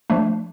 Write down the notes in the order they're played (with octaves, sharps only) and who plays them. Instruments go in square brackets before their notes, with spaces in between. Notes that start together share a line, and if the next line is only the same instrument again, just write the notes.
[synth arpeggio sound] F3 A3 D4